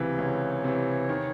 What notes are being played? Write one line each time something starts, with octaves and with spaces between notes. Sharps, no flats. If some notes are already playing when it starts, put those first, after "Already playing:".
Already playing: C#2 C3 E3
C#2 C#5
C3 E3
D#3